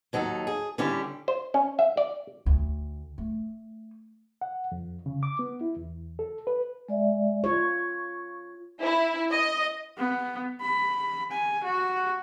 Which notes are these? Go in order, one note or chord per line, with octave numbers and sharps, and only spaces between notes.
D#2 F#3 D#4 A4
G#4
D3 G3 C#4 E4 G4
C5
C#4
E5
D5
D2
A3
F#5
F2
C#3
D6
B3
E4
E2
A4
B4
G#3 D5 E5
F4 C#5 C#6
E4
D#5
B3
B5
G#5
F#4